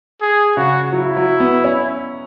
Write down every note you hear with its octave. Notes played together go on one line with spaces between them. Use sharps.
G#4
C#3 F#4
F#3 E4
F#3
B3
C#4